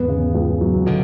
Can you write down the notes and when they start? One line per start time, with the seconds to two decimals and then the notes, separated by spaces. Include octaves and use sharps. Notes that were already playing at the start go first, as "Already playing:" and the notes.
Already playing: E2 G#2 B3
0.08 C#3
0.34 C#2
0.61 F#3
0.86 B2 D3